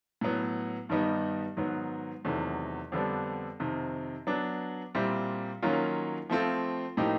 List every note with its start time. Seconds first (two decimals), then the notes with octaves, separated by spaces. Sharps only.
0.21 A2 F#3 B3
0.89 G2 D#3 G3 B3 D#4
1.57 G#2 D#3 F#3 B3
2.24 E2 C3 D#3 F#3 A3
2.92 F2 D3 G3 B3 D4
3.60 F2 C3 D#3
4.27 F#3 B3 D4
4.95 A#2 G3 C4 E4
5.62 D#3 F#3 A#3 C#4 F4
6.30 F3 A3 C4 F4
6.97 A2 F3 A#3 D#4 G4